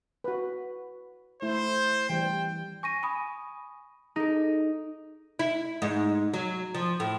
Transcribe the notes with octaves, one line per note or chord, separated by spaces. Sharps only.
F#4 B4
A3 E4 C5
E3 G3 G5
G#5 C#6 A#6 D#7
G#5 B5 D#6
D#4 G#4 A4
E4
G#2
F#3
F3
A2